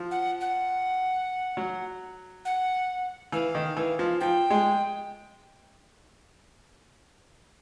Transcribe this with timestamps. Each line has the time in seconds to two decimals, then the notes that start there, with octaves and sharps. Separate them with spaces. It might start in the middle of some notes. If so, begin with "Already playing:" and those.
Already playing: F3
0.11 F#5
0.41 F#5
1.57 F#3
2.45 F#5
3.32 E3 F5
3.55 D#3
3.77 E3
3.99 F3
4.20 F3 G5
4.50 G#3